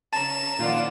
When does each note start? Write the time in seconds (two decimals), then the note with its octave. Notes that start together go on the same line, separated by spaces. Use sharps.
0.13 C#3 C#4 A5 A#5 E7
0.59 A#2 D#3 F3 F4 D5 F#5